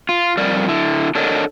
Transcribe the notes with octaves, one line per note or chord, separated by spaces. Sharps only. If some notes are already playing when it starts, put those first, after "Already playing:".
F4
F2 G3 A#4 D5
D3 E4
D4 A4 A#4 C#5 D#5